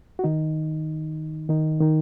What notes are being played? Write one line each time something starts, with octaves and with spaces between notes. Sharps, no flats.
F#4
D#3 D#4
D#3 D#4
D#3 D#4